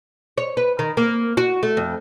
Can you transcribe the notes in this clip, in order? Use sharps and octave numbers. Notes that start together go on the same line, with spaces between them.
C#5
B4
D#3
A#3
F#4
A3
F2